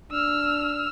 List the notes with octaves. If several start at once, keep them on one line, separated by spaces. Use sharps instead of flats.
D4 E6 F6